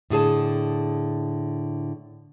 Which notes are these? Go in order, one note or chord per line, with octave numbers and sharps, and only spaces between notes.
A2 D3 G#4 A5